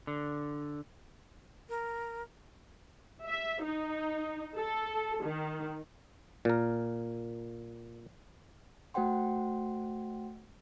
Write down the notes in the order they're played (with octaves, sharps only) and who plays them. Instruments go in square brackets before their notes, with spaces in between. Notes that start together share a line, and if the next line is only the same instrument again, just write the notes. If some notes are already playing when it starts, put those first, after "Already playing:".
[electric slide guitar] D3
[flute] A#4
[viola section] E5
D#4
A4
D#3
[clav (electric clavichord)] A#2 A#4
[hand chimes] A3 F#4 C5 F#5 G5 C6